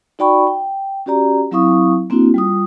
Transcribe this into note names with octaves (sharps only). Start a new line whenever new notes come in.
D#4 F#4 D5 G5 B5 C#6
G5
C#4 F#4 G4 D5 A#5
F#3 C4 E4 F5 C#6 D#6
A#3 C4 D4 E4 F#4
G3 F4 D#6